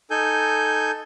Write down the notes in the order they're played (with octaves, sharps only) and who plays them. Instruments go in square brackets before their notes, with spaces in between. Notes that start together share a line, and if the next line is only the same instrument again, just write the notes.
[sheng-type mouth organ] D#4 A4 G#5 G6